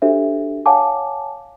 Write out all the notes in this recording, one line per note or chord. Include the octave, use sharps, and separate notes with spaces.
D4 F#4 G4 A4 C5 E5
C#5 F5 F#5 G#5 A5 D6